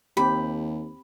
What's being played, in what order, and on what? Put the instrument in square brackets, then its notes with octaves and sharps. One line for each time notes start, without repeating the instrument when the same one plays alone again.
[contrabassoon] D#2 [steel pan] C4 G4 [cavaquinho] B5